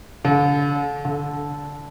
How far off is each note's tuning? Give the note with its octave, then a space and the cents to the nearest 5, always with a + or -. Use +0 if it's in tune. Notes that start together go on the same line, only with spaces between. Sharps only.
D3 -35
D3 -15